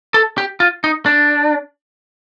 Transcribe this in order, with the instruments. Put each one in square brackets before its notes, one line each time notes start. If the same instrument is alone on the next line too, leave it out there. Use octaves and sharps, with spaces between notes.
[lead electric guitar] A4
G4
F4
D#4
D4